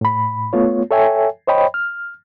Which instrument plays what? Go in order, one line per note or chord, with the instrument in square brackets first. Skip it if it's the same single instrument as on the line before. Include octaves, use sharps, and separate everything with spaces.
[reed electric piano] A2 B5
A3 B3 F4 C#5
A4 C#5 E5 G5 G#5
C5 C#5 D#5 G5 B5
F6